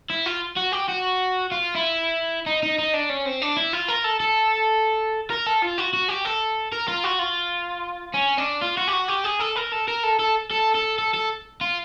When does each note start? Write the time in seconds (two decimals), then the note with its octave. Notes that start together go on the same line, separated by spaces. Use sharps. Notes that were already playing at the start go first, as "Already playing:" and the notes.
0.10 E4
0.26 F4
0.57 F#4
0.73 G4
0.89 F#4
1.52 F4
1.75 E4
2.46 D#4
2.63 D#4
2.78 D#4
2.94 D4
3.09 C#4
3.25 C4
3.42 D4
3.57 E4
3.73 F4
3.88 A#4
4.04 A4
4.20 A4
5.30 A#4
5.46 A4
5.62 F4
5.78 F#4
5.93 F#4
6.09 G4
6.25 A4
6.72 A#4
6.88 F4
7.04 F#4
7.19 F4
8.14 C#4
8.38 D4
8.62 F4
8.77 F#4
8.88 G4
8.93 F#4
9.09 G4
9.25 G#4
9.40 A4
9.56 A#4
9.72 A4
9.88 A#4
10.03 A4
10.19 A4
10.51 A4
10.75 A4
10.98 A4
11.14 A4
11.61 F4